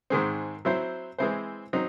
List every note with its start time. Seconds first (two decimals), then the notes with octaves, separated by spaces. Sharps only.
0.10 G#2 D#3 G#3 C4
0.65 F#3 C4 E4 C5
1.18 E3 G#3 C4 E4 C5
1.73 F#3 C4 D#4